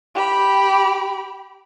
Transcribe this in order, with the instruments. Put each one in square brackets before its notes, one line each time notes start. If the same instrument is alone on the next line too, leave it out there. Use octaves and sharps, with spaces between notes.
[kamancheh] G4 B5